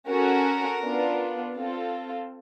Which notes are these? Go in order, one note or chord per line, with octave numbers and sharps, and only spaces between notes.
C#4 F#4 A4 A#4
B3 D4 F4
C4 F4 A4